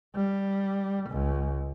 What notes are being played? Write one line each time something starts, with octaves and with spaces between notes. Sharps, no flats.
G3
C#2